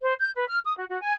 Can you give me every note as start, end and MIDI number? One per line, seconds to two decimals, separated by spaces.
0.02 0.14 72
0.20 0.30 91
0.35 0.46 71
0.48 0.58 89
0.64 0.75 87
0.78 0.85 66
0.90 1.01 66
1.02 1.14 80